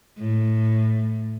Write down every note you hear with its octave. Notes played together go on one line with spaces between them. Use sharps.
A2